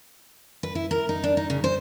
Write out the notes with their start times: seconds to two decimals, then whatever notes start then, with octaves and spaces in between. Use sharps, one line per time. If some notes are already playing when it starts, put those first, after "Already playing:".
0.63 B4
0.75 E4
0.91 A#4
1.09 D#4
1.24 D4
1.37 D#4
1.50 C#3
1.64 C5